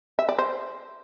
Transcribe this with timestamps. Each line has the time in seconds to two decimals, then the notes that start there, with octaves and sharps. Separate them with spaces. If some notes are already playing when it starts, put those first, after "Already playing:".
0.19 E5
0.29 D5
0.39 C5